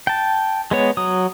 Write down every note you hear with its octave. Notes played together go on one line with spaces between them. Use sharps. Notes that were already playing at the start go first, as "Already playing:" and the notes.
G5 A5
G#3 B3 C#5
F#3 D#6